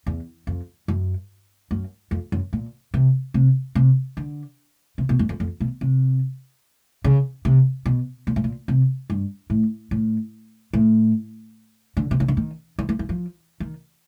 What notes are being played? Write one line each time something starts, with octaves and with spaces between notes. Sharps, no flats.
E2
F2
F#2
F#2
F2
F#2
A#2
C3
C3
C3
D3
C3
B2
F#2
F2
F2
B2
C3
C#3
C3
B2
A#2
A2
A#2
C3
G2
A2
A2
A2
D3
C3
C#3
D3
D#3
E3
E3
E3
F3
D#3